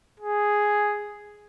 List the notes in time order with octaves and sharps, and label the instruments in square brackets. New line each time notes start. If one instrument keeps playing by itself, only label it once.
[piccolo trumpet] G#4